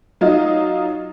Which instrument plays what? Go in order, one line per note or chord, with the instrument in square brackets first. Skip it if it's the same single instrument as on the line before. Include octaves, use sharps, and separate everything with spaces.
[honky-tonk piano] F#3 D#4 F4 D#5